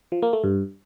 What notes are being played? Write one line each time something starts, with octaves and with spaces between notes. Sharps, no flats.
F3
A#3
A3
G2